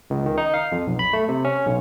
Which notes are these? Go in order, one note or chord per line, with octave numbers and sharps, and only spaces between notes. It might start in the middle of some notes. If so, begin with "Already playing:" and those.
C#2
D#3
D#4
F5
F2
B1
B5
A3
C3
C#4
B1